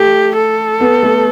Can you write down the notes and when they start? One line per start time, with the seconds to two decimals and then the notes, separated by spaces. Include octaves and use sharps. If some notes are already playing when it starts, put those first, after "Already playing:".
Already playing: A3 G4
0.37 A4
0.81 B3
1.03 A3